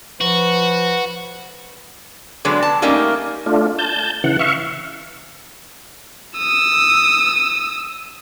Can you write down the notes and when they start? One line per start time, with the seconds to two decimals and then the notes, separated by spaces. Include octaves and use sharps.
0.21 F3 F#4 B4
2.45 D3 F#3 G#3 B3
2.62 A5
2.82 G3 A3 A#3 C#4 D#4
3.46 A3 D4 F4
3.79 A5 G6
4.24 C#3 E3 F#5
4.39 E5 F5 C#6
6.38 D#6 E6